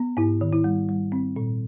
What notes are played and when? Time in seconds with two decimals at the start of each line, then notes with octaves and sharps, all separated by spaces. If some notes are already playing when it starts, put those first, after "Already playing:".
Already playing: B3
0.17 G#2 E4
0.41 D#3
0.53 E4
0.64 G3
0.89 G3
1.12 C4
1.36 A#2